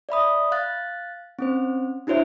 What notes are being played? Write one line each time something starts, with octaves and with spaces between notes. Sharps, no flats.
D5 E5 B5 D#6
F5 F#6 A6
C4 C#4 C5
D4 E4 F#4 C5 C#5 E5